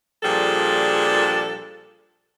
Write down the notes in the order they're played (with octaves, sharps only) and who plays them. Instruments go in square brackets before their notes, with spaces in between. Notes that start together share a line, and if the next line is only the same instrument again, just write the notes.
[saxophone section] A#2 F3 G3 D4 G#4 A4